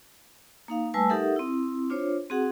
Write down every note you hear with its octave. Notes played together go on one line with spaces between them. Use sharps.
A#3 D#4 F5
G3 A3 B4 G#5 A5 E6
D#4 G4 A4 A#4 E5 F#5
C4 E4
D4 F4 C5 C#5
C4 F#4 G#4 F#5